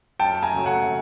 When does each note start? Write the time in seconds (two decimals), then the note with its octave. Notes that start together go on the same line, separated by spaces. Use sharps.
0.19 F#2 G5 A5
0.42 G#5 A#5
0.54 C#3 F#3 A3
0.66 F#5 G#5